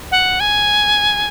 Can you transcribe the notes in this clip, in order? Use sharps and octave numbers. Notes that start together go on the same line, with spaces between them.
F#5
G#5